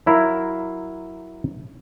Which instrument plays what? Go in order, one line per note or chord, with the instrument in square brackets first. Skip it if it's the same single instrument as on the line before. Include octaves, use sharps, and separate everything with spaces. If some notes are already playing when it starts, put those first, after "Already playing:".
[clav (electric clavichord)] F#3 E4 A#4 F5